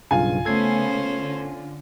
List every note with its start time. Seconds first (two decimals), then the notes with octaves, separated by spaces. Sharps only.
0.11 B1 G2 C#3 F4 G#5
0.45 C#3 A3 B3 C#4 A4 C5 G#6 C7
1.18 D3